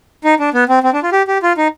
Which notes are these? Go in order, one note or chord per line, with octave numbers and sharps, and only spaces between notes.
D#4
D4
B3
C4
C4
D4
F4
G4
G4
F4
D#4